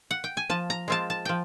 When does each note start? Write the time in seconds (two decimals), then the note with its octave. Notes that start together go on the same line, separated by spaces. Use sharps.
0.11 F#5
0.24 G5
0.37 G#5
0.50 F3 A5
0.70 A#5
0.88 G#3 C4 F4 A5
1.10 A5
1.25 F3 G5